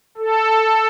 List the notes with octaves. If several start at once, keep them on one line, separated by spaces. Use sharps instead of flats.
A4